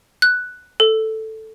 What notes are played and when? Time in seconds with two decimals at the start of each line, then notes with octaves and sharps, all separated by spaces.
0.22 F#6
0.80 A4